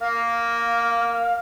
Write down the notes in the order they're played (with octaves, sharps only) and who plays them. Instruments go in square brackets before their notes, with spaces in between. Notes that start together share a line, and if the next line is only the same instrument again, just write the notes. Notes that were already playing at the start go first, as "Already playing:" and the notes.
[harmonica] A#3 [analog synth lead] F5